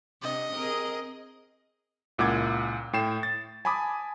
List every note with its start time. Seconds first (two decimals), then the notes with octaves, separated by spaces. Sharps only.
0.22 C3 D4 D#5
0.55 C4 G#4 A#4
2.18 C#2 A#2 E4 F#5 D6 G#6
2.93 A2 G5 C7 E7
3.23 A6
3.65 G#5 A5 B5 D6 D#6